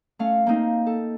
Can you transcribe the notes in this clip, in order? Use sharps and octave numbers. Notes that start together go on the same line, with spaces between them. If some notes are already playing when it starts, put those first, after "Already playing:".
A3 C#4 F5
A#3 C4 D#4
A4